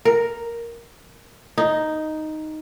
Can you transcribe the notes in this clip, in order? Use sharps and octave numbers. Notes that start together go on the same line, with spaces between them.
A#4
D#4